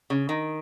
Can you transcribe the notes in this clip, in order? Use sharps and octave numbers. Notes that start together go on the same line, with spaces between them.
C#3
D#3